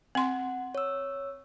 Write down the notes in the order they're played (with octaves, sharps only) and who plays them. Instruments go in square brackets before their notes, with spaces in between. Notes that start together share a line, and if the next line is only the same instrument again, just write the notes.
[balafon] C4 C6 [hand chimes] F#5
[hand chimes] C#5 E6